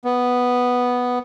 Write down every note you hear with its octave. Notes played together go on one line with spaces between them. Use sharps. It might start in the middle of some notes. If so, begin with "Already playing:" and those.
B3